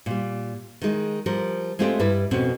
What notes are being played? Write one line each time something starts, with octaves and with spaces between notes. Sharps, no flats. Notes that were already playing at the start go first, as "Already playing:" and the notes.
A#2 G3
D#3 G#3
F3 G3 A#4
G#3 A3 C4 F4 G4 D5
G2 G3 E4 B4
F2 B2 C4 C#4